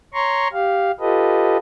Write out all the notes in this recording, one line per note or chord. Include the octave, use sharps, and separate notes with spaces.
C#5 A#5 C6 C#6
G4 F5
F4 G4 A4 B4 D#5